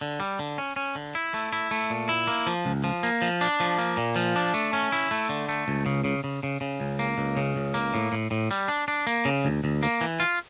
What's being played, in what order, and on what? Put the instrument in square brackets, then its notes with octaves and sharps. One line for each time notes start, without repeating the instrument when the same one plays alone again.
[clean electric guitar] D3
G3
D3
C#4
C#4
D3
E4
A3
E4
A3
A#2
E4
A#3
F3
C#2
F3
A#3
F3
D4
F3
A#3
A#2
F3
D4
A3
C#4
E4
A3
D3
A3
C#2
C#3
C#3
C#3
C#3
C#3
C#2
A#3
C#2
C#3
C#2
A#3
A2
A2
A2
G3
D4
D4
A#3
C#3
D2
D2
A#3
E3
F4